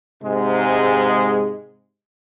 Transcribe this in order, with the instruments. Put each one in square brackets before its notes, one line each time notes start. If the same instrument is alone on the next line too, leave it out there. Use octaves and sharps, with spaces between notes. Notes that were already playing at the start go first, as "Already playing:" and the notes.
[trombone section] G#2 C3 G#3